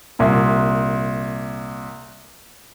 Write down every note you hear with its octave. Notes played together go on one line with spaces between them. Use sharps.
C2 A#2